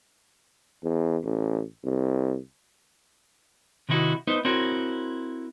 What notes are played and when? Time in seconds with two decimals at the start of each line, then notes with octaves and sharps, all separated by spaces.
0.84 E2
1.24 A1
1.84 C2
3.89 C3 D#3 D#4 E4 F#4
4.27 B3 D#4 B4 C5 E5
4.45 C4 E4 F#4 A#4 C#5